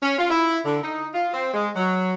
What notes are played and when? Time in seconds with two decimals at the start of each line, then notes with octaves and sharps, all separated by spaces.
0.03 C#4
0.19 F4
0.30 E4
0.65 D3
0.83 D#4
1.14 F4
1.34 C4
1.54 G#3
1.76 F#3